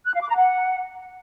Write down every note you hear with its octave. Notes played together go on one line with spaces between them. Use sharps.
F#6
F5
D6
A#5
F#5